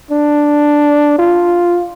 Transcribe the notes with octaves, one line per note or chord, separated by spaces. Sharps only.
D4
F4